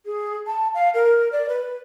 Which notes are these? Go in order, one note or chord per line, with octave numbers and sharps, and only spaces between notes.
G#4
A5
F5
A#4
D5
B4